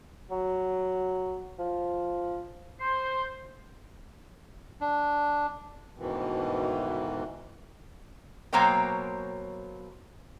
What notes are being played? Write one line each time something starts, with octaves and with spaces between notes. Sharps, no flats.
F#3
F3
C5
D4
D2 G#2 B2 D#3 E3
B2 F#3 A#3 C5 C#5 G5